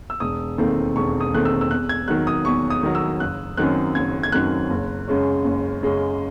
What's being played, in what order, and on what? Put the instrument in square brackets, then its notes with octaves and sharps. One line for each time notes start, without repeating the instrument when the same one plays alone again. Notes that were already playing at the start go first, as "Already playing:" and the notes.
[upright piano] E6
E1 D#6
D#2 D#3 A3 C4
E1 C#6
D#6
D#2 D#3 A3 C4 F#6
E6
E6
E2 F#6
G#6
D#3 F#3 F#6
D#6
E2 C#6
D#6
D#3 F#3
E6
F#1 F#6
F#2 D#3 F#3 C4 F#6
F#1 G#6
G#6
F#2 D#3 F#3 C4 F#6
F#1
F#2 C#3 G#3 C#4
F#1
F#2 C#3 G#3 C#4